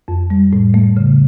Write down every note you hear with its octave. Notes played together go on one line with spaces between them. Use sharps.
F2
G3
A2
A3
C#3